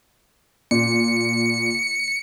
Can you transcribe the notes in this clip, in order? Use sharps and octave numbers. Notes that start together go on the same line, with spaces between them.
A#2 C#7